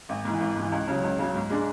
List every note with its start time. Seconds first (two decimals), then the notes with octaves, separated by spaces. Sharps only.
0.09 G#1
0.25 G#2 E3
0.40 G#1
0.56 G#2 E3
0.72 C#2
0.87 C#3 F#3
1.04 C#2
1.19 C#3 F#3
1.35 G#2
1.50 G#3 D4